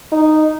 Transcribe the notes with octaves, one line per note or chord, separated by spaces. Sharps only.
D#4